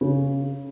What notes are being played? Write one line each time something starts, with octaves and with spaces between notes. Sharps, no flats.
C#3